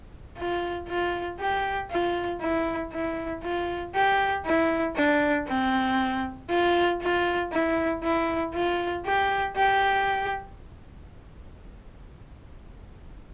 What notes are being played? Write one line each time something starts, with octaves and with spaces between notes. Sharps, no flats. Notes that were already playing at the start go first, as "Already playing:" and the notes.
F4
F4
G4
F4
E4
E4
F4
G4
E4
D4
C4
F4
F4
E4
E4
F4
G4
G4